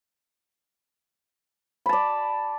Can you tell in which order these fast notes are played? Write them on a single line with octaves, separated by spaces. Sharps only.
B5 A5 D5